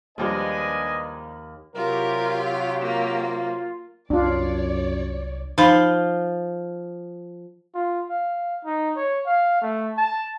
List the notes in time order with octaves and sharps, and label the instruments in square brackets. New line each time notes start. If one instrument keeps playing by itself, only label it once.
[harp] D#2 [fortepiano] F3 G3 G#3 [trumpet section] D4 B4 G#5 [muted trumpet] D#5
[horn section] C3 F#3 [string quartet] F4 [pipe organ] G4 [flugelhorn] A#4
[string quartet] A#3 [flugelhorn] F4
[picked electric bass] C2 F#3 [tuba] F#2 [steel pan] D4 F4 [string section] C#5 D5
[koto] F3 F4 [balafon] D#4 B5
[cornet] F4
F5
D#4
C#5
F5
A3
A5